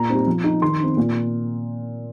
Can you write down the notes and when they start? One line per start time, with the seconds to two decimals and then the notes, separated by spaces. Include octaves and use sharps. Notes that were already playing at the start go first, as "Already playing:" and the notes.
Already playing: A#2 A#5
0.09 G3 C4 D#4
0.27 F3
0.44 D#4
0.62 D#3 C6
0.80 C4 D#4
0.97 A#2